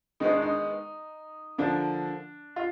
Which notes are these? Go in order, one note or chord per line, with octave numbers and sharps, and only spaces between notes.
D#3 G#3 B3 D#4
D4
D#4
D3 F3 A#3 D4
F4